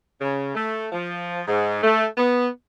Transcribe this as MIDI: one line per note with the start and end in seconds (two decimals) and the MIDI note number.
0.21 0.52 49
0.54 0.88 57
0.92 1.42 53
1.47 1.81 44
1.83 2.05 57
2.17 2.48 59